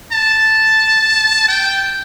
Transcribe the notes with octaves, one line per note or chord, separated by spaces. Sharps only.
A5
G5